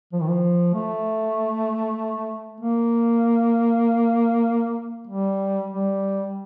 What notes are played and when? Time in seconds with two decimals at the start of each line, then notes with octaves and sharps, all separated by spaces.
0.12 F3
0.21 D#3
0.29 F3
0.74 A3
2.60 A#3
5.07 G3
5.70 G3